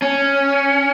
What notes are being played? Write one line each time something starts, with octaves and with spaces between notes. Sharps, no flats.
C#4